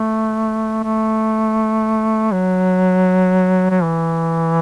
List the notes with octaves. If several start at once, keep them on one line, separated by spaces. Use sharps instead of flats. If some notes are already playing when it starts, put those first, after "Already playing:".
Already playing: A3
A3
F#3
F#3
E3